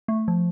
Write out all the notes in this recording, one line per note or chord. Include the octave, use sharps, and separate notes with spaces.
A3
F3